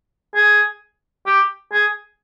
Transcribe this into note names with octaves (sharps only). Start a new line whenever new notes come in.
G#4
G4
G#4